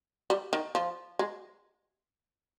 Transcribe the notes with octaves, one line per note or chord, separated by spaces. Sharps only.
G3
D#3
F3
G#3